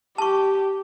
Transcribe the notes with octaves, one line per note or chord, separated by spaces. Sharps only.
G4 A5 C#6